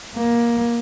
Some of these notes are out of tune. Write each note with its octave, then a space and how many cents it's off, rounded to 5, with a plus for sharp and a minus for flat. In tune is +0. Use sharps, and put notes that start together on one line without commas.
A#3 +15